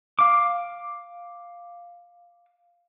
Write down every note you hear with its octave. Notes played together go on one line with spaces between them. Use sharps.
F5 D6